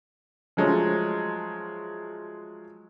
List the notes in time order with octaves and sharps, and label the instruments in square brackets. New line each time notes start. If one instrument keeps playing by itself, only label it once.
[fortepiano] F3 F#3 G#3 A3 C#5